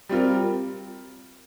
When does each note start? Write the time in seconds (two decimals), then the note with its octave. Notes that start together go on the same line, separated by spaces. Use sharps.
0.09 G3 C4 F4 A#4